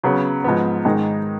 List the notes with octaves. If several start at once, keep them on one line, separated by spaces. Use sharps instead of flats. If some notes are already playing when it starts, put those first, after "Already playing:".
C#3 F#3 B3
G#2 F3 B3
G#2 D#3 G#3 D#4